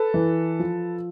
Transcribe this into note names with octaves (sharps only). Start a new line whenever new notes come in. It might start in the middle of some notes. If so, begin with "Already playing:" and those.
Already playing: A4 B4
E3
F3